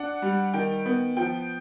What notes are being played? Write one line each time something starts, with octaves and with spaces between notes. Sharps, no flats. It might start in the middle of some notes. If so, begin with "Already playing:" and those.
Already playing: D4 F#5
G3
D#3 G5
B3
F3 G5